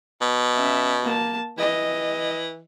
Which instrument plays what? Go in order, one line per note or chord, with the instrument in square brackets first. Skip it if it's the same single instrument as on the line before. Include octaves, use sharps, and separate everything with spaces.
[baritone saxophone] B2
[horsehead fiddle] C#4 E5
A#3 A5
[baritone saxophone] E3 [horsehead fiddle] D#5